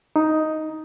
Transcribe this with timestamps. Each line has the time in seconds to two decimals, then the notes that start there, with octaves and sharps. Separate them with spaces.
0.16 D#4